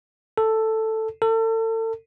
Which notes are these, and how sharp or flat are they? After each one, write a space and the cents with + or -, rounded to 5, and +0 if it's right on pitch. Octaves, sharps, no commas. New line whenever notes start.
A4 +5
A4 +35